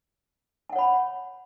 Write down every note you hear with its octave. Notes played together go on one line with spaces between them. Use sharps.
C#5 F#5 G#5 B5